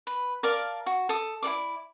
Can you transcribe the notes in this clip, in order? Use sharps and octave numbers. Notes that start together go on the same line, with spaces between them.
B4
A#4 D5 F5 A5
F#4
A4 D#6
E4 A4 D5 D6